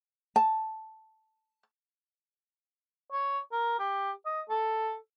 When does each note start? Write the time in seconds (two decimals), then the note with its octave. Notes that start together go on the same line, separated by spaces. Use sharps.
0.36 A5
3.12 C#5
3.52 A#4
3.79 G4
4.26 D#5
4.49 A4